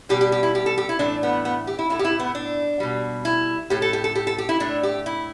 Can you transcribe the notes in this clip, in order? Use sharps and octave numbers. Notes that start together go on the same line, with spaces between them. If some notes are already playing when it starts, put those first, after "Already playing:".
B2 G3 G4
G4
G4
E4
G4
A4
G4
E4
A2 E3 A3 D4
B3
B3
G4
E4
A2 A3 E4
G4
E4
B3
D4
B2 G3
E4
A2 A3 G4
A4
G4
A4
G4
A4
G4
E4
A2 A3 D4
G4
E4